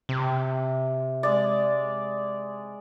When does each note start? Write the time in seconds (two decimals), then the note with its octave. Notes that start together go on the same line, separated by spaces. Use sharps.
0.09 C3
1.23 G#3 D5